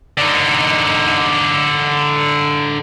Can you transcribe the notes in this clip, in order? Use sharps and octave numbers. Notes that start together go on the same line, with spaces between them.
D3 D#4